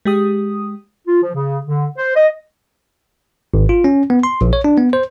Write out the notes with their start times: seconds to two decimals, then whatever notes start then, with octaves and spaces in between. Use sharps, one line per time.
0.05 G#3 G4 D#6
1.07 F4
1.23 F3
1.35 C#3
1.67 D3
1.98 C5
2.16 D#5
3.54 G#1
3.69 F4
3.84 C#4
4.10 B3
4.23 C6
4.41 A#1
4.53 C#5
4.64 D4
4.78 B3
4.93 C5